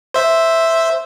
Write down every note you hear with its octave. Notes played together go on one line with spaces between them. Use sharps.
C5 E5